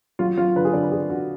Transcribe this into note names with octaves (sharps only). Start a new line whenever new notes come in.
F#3 F4
F#3 F4
D3 B4
G#4
D3 D5
B4
D3 G#4
D3 F#4